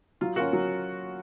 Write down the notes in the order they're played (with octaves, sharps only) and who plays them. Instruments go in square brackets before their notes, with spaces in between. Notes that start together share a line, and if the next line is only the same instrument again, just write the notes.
[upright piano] F#3 [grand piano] F4
[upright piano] C#4 F4 A#4 [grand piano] F#4
[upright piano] F#3